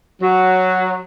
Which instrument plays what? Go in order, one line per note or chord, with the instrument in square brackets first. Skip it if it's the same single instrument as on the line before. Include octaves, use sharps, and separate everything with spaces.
[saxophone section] F#3